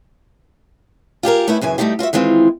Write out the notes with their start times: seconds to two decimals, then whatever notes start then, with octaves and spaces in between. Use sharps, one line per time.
1.23 F4 G4 G#4 A#4
1.47 A3 B3 C#4 D#4 E4
1.61 F#2 C#3 E3 G#5
1.78 B2 G3 A3 D#4 F4 G4
1.99 F4 F#4 C5 E5
2.13 D#3 E3 G#3 C4 F4